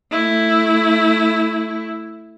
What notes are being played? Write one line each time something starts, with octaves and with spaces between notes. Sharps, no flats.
A3 E4